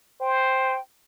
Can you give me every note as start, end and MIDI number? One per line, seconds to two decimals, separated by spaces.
0.20 0.78 72
0.20 0.80 79